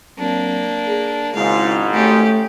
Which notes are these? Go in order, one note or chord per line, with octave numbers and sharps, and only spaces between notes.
F#3 A#3 C4 D4
G#4
G#1 G#2 C#3 G#3 E4 F5
A3 C#4 G4